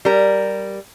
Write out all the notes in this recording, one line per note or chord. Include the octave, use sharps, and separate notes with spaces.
G3 A#4